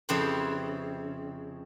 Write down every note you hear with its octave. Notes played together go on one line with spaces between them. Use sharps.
F2 C#3 E4 G4 B4 C5